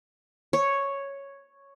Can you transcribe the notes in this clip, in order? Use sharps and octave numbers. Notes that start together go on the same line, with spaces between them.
C#5